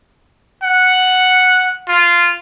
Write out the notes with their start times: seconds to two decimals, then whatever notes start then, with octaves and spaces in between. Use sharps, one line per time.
0.63 F#5
1.88 F4